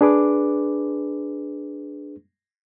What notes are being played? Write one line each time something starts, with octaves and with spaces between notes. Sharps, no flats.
D4 G#4 B4 D6